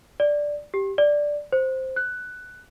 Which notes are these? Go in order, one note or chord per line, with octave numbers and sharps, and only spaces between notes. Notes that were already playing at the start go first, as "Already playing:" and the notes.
D5
G4
D5
C5
F#6